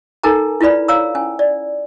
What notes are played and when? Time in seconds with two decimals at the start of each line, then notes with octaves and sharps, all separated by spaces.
0.23 D#4 A4 A#4 G#5 A#5
0.61 E4 F4 B4 D5 B5
0.88 C#5 F5 A#5 E6
1.15 C#4 G#5
1.39 D5